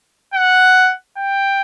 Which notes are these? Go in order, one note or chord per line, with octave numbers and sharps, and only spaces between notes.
F#5
G5